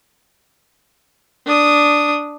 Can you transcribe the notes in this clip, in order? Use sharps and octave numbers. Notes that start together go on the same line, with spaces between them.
D4 D#6